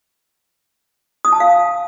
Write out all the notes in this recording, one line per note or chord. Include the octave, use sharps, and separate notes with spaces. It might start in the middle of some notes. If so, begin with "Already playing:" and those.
D#6
A5
F5